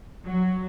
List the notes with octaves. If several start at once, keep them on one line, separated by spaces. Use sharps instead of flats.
F#3